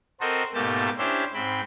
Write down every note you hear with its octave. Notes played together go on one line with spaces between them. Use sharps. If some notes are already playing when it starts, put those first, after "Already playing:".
C4 F#4 A4 A#4 C5 D#5
G#2 B2 A3 A#3 G4 A5
C#4 D4 E4 G4 C5
G#2 C4 G5 B5